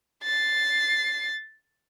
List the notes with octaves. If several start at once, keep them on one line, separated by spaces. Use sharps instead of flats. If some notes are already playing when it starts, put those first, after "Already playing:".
A6 C7